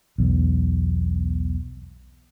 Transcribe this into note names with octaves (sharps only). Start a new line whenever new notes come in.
B1 E2